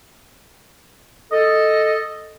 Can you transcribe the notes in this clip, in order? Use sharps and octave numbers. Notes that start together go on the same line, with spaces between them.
A4 D#5